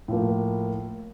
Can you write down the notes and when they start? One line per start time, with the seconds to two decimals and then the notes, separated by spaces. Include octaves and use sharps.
0.08 A2 F3 A#3